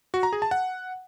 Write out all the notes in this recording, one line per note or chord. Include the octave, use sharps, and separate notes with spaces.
F#4
A#5
G#4
A5
F#5